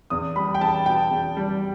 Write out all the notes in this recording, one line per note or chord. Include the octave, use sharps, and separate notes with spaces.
E2 D#6
G3 B5
G5
E2 A5
B2 G5
E2
G3